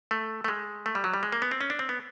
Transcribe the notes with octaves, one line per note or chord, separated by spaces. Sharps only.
A3
A3
G#3
A3
G3
F#3
G3
G#3
A#3
B3
C4
C#4
D4
C4
B3